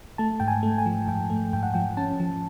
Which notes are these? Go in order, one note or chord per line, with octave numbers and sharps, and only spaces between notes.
A3 A5
G#2 G5
G#5
A3
G#5
F3
G#2 G5
A3
G#2 G5
F#5
F3 G5
C#4 A5
F3